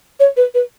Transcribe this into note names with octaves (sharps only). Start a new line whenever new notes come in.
C#5
B4
B4